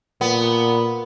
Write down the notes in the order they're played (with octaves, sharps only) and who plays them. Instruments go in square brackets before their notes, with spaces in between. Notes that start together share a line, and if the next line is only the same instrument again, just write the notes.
[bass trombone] A#2 [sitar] B3